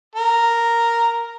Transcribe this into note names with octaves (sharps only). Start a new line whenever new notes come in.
A#4